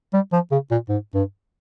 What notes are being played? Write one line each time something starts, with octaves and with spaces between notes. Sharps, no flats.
G3
F3
C#3
A#2
G#2
G2